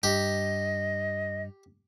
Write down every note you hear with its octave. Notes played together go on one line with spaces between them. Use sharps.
G2 G4 D#5